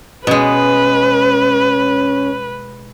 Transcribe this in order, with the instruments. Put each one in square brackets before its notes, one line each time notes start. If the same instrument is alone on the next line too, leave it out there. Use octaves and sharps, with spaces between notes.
[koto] B2 G#3 [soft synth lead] C#4 [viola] B4